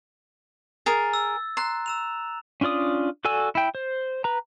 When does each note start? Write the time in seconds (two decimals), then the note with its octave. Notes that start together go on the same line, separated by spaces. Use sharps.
0.86 G#4 A#4 A6
1.14 E6
1.57 A#5 C6 F#6
1.86 E6 E7 F7
2.61 C#4 D4 F4 D5 D#6
3.25 F#4 A4 D5 G#5 E6
3.55 E4 G5
3.75 C5
4.24 B4 A#5